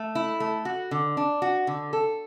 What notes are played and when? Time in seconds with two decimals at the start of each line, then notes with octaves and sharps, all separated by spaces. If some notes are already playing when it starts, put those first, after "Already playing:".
Already playing: A3
0.15 E4
0.40 A3
0.65 F#4
0.91 D3
1.17 D4
1.42 F#4
1.67 D3
1.93 A4